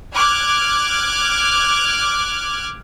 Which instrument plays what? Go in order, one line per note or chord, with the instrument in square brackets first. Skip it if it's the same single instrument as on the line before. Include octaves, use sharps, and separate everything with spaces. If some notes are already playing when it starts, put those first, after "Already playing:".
[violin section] D6 F6 F#6 G#6